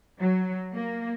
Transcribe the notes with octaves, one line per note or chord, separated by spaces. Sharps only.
F#3
A#3